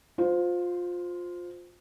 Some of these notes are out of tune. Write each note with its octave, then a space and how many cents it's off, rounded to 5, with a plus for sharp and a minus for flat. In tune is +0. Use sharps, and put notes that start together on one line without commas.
F4 +20 C5 -10